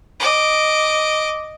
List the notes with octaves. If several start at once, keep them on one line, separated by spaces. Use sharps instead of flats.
D#5 D6